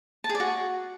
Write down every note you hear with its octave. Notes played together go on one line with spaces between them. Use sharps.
A5
G#4
D5
F#4